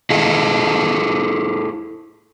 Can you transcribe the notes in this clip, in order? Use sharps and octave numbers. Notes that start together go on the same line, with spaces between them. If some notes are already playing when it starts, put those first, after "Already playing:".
E4 G#4 A4 D#5 F5